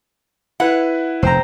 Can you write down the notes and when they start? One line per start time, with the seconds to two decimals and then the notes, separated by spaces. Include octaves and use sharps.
0.60 E4 B4 F#5
1.23 F1 C5 G5 A#5